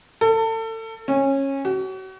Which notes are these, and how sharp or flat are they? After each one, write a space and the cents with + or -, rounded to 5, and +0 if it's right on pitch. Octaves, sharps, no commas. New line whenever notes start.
A4 +30
C#4 -20
F#4 +35